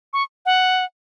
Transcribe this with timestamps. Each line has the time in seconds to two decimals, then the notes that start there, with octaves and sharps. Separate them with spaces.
0.13 C#6
0.46 F#5